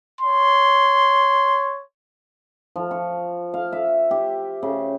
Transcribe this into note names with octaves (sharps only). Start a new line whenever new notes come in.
C#5 C6
F3
C#6
F5
E5
G4
C#3